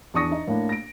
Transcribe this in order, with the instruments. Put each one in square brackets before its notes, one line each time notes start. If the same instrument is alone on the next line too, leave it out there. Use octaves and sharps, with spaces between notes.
[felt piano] E2 D4 C#6 D#6 A#6 C#7
D#4 D#5
A2 A#3 D4
A#6 D7